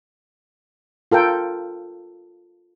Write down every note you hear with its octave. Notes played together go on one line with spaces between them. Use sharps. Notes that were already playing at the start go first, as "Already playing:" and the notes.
F4 A4 A#4 G5